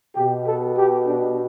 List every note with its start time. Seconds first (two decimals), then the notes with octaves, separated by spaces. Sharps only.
0.16 B2 G4
0.46 A4
0.77 G4
1.06 D4